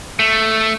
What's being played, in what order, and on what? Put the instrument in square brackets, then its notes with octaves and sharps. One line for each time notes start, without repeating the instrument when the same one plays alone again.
[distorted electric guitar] A3